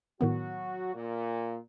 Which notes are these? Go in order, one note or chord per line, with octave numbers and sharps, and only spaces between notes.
A2 D#3 F#3 B3 F#4
A#2